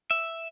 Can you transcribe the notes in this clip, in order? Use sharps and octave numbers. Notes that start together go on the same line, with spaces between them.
E5